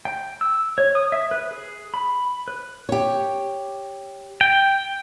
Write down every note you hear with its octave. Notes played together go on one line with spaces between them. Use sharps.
G5
E6
C#5
D#6
E5
B4
G#4
B5
B4
G4 C#5
G5